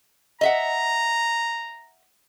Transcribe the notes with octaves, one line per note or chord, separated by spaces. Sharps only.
D#5 E5 F#5 A#5